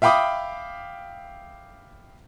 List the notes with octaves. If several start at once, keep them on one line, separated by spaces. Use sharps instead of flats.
E5 F5 G5 B5 D6 D#6